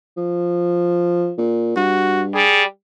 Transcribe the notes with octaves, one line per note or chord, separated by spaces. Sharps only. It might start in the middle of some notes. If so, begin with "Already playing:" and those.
F3
A#2
G2 F#4
G3 G#4